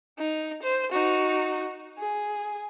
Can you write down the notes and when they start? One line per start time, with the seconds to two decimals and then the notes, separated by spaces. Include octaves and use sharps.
0.18 D#4
0.63 C5
0.92 D#4 F#4
1.99 G#4